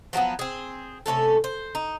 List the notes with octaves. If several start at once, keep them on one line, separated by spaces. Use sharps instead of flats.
F3 F#3 A3 B3
C4 G#4
C3 A3 C#4 A4
C5
D#4